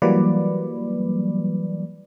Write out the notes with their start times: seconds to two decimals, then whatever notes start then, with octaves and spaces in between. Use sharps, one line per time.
0.02 E3 F#3 G3 A#3 B4 D5